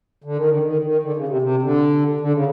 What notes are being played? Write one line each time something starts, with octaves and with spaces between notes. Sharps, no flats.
D3
D#3
D3
D#3
D#3
D3
C#3
C3
C3
D3
D3
C#3